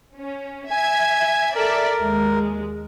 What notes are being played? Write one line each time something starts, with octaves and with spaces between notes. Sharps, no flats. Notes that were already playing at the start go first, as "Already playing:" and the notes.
C#4
E5 G#5 G#6
A4 A#4 D5 E5
D#2 G#3